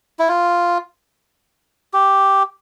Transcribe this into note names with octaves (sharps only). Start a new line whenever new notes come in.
E4
F4
G4